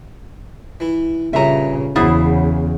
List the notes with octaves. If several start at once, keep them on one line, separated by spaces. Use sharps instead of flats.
E3 E4
G2 A#2 C#3 C#4 E5 A#5
E2 C#3 F#3 B3 E4 G#4 C5